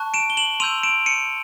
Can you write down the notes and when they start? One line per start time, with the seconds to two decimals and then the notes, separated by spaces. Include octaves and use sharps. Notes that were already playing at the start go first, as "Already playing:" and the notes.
Already playing: A5 C#6 F#6
0.14 D7 E7
0.30 G7
0.37 E7 F#7
0.60 C6 E6 G6 D#7 F7
0.83 D7 E7
1.06 C#7 D#7